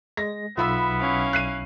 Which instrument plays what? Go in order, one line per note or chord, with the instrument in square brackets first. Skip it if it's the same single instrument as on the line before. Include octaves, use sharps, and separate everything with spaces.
[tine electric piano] G#3 [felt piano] A#6
[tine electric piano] B1 [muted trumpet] B3 [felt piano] F4 B5 E6 [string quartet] E5
[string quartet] C#4 E4 F5
[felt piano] F#6 C7 D#7